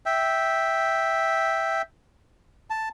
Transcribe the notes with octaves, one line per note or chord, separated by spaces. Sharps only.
E5 G5
A5